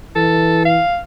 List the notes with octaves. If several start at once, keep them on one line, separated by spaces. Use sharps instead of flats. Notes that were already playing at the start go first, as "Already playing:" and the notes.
E3 A4
F5